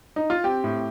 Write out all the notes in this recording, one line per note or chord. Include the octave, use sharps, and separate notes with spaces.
D#4
F4
C4 G4
A2